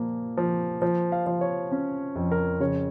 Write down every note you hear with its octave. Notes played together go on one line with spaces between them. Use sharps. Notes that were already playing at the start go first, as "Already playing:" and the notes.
Already playing: A#2 F3 A#3
F3
F3
F5
F3
C#5
C#4
F2
A#4
C#3 C#5